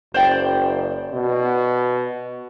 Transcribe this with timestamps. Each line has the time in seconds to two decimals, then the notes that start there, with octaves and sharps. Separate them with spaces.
0.14 F#1 C5 D5 G5
1.13 B2